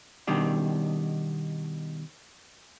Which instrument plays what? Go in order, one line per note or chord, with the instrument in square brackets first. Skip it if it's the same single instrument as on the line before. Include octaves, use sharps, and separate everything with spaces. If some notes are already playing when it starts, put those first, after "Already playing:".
[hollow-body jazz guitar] B2 D#3 G3 D4